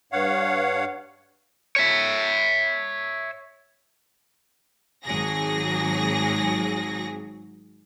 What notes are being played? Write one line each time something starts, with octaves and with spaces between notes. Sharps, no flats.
G2 C#5 F5 F#5
C#5 E5
G#1 F#3 G#4 A#6